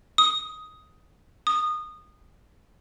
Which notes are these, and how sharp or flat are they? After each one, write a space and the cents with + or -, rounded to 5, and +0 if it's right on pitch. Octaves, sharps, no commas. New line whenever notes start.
D#6 +10
D#6 -20